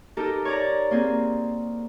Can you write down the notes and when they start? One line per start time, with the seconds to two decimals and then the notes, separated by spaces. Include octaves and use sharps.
0.17 D#4 G4 A4 A#4
0.45 C#5 D5 A#5
0.91 A#3 C4 G#4